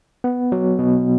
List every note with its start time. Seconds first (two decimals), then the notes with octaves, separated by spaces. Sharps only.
0.24 B3
0.52 F#3
0.79 B2